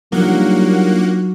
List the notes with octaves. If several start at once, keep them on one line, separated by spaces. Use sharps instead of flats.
F#3 G3 A#3 D4 D#4 F4 F#5